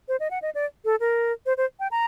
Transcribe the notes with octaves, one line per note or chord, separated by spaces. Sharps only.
C5
D#5
F#5
D#5
D5
A4
A#4
C5
C5
G5
A#5